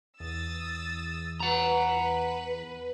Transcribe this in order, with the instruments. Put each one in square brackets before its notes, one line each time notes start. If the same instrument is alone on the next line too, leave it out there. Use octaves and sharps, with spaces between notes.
[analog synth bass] E2 [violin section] D#6 E6 A6
[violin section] B4 [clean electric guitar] F#5 A#5